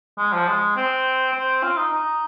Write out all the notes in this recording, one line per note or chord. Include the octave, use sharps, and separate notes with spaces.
G#3
F3
G#3
C4
C4
F4
D#4
D#4